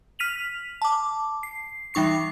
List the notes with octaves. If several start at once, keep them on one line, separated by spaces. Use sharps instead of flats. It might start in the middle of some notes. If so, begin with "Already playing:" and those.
F6 B6 D#7 F7 F#7
A5 D6
C7
E3 G3 D#4 C#6 C7